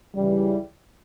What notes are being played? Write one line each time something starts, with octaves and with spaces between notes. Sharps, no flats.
C#2 C#3 E3 G3